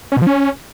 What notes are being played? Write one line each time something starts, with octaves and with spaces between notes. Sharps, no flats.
C#4
B2
F3
C#4